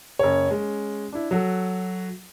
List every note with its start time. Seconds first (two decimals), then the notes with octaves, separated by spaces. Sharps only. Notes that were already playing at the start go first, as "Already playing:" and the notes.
0.19 F#1 C#5
0.49 G#3 C#4
1.12 D4 E4
1.31 F#3 F#4 A4